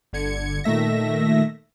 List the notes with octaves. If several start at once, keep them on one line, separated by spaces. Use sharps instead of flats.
G1 D3 G#6 C#7
A#2 D#3 A3 E5 A#6